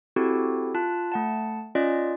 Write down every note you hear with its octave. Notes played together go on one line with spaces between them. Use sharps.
C4 E4 F#4 G4 A4
F4 A5 F#6
A3 F#5 A5
C#4 F4 D5 D#5